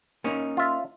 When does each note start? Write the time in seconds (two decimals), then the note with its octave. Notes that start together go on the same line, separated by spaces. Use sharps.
0.24 A#3 C#4 D#4
0.57 F4 E5